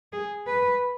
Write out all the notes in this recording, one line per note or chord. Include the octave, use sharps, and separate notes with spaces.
G#4
B4